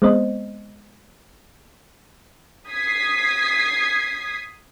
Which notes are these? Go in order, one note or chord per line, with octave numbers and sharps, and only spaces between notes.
G#3 B3 C4 C5 D#5
D#6 G#6 B6 C7